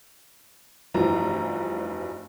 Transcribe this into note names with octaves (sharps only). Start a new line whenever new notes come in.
F1 G2 E3 F3 F#4 A#5